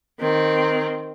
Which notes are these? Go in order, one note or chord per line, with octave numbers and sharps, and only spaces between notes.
D#3 C4